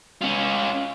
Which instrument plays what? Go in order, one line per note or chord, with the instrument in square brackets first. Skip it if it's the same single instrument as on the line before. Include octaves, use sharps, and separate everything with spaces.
[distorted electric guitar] C#4 F4